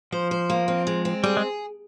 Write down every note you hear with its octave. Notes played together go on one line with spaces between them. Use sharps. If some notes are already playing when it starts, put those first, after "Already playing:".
F3 C5
C5
A#3
C4
G#3
C4
G3 G#4
G#3